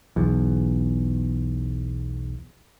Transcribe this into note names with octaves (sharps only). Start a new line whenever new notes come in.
B1 E2